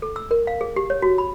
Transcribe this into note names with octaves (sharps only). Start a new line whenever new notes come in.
A4
E6
A#4
F5
G#4
G4
C#5
F#4
B5